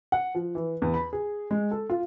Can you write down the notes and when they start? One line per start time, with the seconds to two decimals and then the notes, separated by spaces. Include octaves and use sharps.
0.12 F#5
0.35 F3
0.55 E3
0.82 E2
0.94 B5
1.13 G#4
1.51 G#3
1.71 A4
1.90 F4